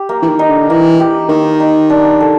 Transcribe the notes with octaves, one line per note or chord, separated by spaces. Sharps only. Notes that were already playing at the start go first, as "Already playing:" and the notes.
Already playing: G4
A#3
E3
D#3
D#4
D3
E3 A#3
G4
D#3 A#3
D#4
D4
A4